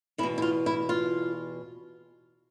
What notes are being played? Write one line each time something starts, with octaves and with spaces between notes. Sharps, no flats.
E2 B2 E4
E4
F4
E4
F4